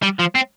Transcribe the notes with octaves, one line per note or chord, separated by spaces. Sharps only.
G3
F3
C4